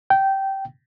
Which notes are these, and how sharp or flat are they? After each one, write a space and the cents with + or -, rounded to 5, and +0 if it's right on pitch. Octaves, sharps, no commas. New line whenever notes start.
G5 -15